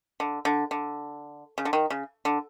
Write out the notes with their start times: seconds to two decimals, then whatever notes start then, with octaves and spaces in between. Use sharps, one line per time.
0.20 D3
0.45 D3
0.71 D3
1.58 C#3
1.65 D3
1.73 D#3
1.90 C#3
2.25 D3